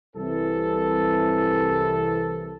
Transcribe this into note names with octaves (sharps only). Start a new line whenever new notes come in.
C2 E3 A4